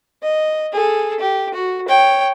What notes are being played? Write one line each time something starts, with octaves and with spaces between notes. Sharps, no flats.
D#5
G#4 A4
G4
F#4
C#5 G5